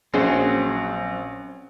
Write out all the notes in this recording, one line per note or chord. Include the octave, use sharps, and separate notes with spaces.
A#1 F#3 C4 C#4 G#4